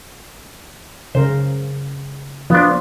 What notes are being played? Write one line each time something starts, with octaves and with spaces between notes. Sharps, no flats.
C#3 A#4 C5
F3 B3 D4 F4